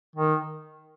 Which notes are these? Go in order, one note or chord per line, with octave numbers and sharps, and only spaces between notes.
D#3